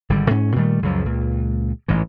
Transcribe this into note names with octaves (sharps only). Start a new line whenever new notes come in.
G#1 D3 G3
G#2 C#4
A#2 D#3 G3 A3
C#2 F#2 F3
C#2 A#2
A1 G#2 E3